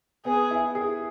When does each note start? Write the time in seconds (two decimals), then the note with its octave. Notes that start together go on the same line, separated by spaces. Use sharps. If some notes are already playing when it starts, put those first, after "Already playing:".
0.25 B3 G#4
0.51 E4
0.75 G#4